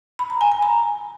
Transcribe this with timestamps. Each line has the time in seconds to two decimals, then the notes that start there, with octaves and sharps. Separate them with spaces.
0.19 B5
0.30 A#5
0.41 G#5
0.52 G#5
0.62 A#5